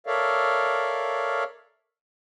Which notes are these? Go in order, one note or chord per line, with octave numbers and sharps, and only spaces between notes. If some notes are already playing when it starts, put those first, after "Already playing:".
A4 A#4 C#5 D5 E5 F5